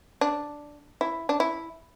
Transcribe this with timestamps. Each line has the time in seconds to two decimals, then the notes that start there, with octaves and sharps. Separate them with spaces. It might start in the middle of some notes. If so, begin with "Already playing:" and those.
0.21 D4
1.01 E4
1.29 D4
1.40 E4